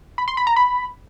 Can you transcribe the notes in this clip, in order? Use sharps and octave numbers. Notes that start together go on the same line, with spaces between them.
B5
C6
B5
A#5
B5